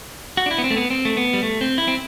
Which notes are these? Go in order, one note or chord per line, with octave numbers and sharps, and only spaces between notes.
F#4
D4
E4
B3
C4
A3
B3
C4
A3
B3
G3
A3
C4
E4
C4